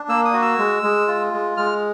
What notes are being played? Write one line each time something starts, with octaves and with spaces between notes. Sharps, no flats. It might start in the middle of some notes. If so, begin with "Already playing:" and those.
Already playing: D4
A#3 E6
D#6
F#4
E6
G#3
G#3
F4
G#3
G#3 F6